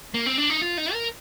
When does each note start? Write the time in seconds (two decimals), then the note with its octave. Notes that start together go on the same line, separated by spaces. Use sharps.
0.14 A#3
0.26 C4
0.38 D4
0.50 D#4
0.62 F4
0.78 D#4
0.93 A#4